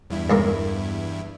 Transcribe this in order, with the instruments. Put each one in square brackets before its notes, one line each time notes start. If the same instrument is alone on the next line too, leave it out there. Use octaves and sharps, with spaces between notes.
[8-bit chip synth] E2 G2 E4
[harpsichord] C#2 A2 A#3